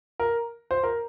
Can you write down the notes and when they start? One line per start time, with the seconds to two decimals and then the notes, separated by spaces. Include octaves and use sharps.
0.20 A#4
0.71 C5
0.83 A#4